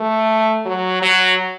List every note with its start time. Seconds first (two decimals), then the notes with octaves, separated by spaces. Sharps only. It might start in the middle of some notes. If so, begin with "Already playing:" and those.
Already playing: A3
0.66 F#3
1.02 F#3